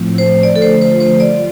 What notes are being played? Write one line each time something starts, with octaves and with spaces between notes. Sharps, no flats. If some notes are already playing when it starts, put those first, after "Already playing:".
Already playing: A2 F3 A3 C4
C5
D3 F3 A3 F4 D5
A4
C5
C5
C5
G3 F4 D5